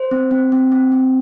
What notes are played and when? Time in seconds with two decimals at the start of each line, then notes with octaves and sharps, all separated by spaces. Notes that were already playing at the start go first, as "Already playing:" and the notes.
Already playing: C5
0.11 C4
0.31 C4
0.52 C4
0.72 C4
0.92 C4